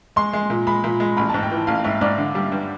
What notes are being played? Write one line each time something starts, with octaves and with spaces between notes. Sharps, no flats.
G#3 C6
G#3
A#2
G#3 B5
A#2
G#3
A1 B5
A5
G#2
G5
E3
A1 F5
G#2 E5
G#2 D5
D3
G3
G2